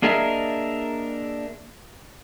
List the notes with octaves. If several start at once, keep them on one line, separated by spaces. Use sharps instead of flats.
A#3 D4 G#4 A#4 D#5 E5